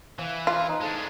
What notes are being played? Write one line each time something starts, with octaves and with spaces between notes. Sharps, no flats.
E3 C5 F5
F4
D#4 F5
G#3 D4 A4 C5